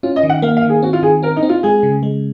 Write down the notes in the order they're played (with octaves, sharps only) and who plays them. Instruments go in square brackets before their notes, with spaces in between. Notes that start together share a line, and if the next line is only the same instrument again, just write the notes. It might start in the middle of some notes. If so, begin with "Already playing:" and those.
[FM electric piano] C#4 [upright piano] F4
[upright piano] D#5
[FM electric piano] D#3
[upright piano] F#5
[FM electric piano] A#3 [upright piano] F5
[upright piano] F5
[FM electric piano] D#3
[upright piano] G#4
[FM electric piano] C4 [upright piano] F#4
[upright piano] F4
[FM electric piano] D#3 [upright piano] G#4
[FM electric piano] C4 [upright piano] A#4
[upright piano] D#4
[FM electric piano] C4
[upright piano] F4
[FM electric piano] G#3 [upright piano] G#4
[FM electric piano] C#3
G#3